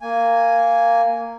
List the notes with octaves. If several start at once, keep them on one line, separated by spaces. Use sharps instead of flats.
A#3 G#5